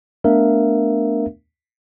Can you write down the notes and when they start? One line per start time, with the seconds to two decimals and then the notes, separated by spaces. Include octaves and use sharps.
0.24 A3 B3 D4 A#4 E5 F5